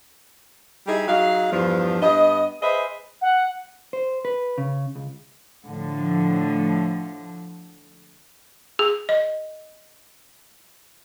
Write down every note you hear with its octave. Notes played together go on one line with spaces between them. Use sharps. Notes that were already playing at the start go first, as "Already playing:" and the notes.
G3 D#4 E4 G4 G#4
F#3 D#4 G#4 F5
E2 G2 F3
G2 B3 D#5
G#4 B4 C5 D#5 E5
F#5
C5
B4
C#3
C#2
A2 D3 F3
G#4
D#5